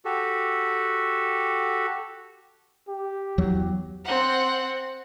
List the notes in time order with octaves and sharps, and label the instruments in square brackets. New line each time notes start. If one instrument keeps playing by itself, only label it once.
[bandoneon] F#4 G4 A4
[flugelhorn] G4
[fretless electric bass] E2 F#3
[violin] C4 F#5